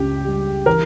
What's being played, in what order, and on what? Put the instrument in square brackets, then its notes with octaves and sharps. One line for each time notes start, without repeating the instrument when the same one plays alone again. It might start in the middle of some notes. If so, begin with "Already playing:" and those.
Already playing: [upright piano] C#2 C#3 [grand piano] G4
[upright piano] G3
[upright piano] E3 [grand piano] A#4